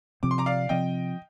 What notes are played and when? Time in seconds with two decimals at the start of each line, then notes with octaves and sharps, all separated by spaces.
0.23 C3 F3 C4 D6
0.31 C6
0.38 A#5 D6
0.46 D5 F5
0.69 C3 F3 C4 D#5 G5